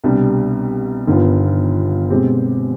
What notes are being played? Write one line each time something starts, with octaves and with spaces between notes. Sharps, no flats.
C2 B2 G3 D4
G1 G2 D#3 B3 F4
B2 G#3 C4 G4